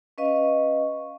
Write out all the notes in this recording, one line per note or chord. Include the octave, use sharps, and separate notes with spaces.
C#4 B4 D#5 F5 C#6